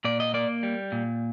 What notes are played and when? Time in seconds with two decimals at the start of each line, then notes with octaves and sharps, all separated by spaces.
0.04 A#2 D5
0.20 D#5
0.34 A#3 D5
0.63 G3
0.92 A#2